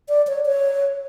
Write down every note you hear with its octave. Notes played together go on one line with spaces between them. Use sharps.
D5
C#5
C#5